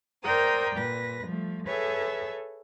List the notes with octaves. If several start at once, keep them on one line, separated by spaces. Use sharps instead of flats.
A#4 C5 D5 G5 A#5 D#6
A#2 B4 A#6
F3 G3 A3
G#4 A4 B4 C#5 E5